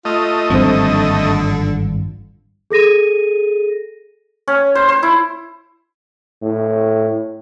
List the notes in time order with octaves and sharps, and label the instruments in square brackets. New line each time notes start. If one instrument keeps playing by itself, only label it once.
[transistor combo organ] A3 D#5 [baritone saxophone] F4
[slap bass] G#1 G2 F3 [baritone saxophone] D3 [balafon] C4 C5
[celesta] G#4 A4 A#6 D#7
[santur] C#4
C5
C5
E4
[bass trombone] A2